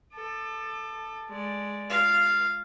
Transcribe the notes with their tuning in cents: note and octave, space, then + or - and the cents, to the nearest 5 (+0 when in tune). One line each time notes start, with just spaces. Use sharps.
A4 +5 D6 +40
G#3 +0 D5 +0
F4 +0 F5 -5